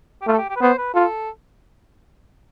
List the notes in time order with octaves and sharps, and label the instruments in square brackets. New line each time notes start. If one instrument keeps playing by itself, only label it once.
[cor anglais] G4
[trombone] A3 [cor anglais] F4
[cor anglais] A4
G4
G4
B4
[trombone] B3 [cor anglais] C5
[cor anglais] B4
[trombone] F4 [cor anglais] A4